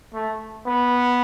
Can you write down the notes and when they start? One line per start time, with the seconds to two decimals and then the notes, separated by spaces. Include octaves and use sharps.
0.14 A3
0.66 B3